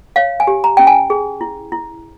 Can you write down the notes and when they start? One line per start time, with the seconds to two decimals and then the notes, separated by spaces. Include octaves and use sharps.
0.16 C#5 F5
0.40 G#5
0.47 G4
0.64 A#5
0.77 C#4 G5
0.87 G#5
1.10 G#4
1.41 E4
1.72 E4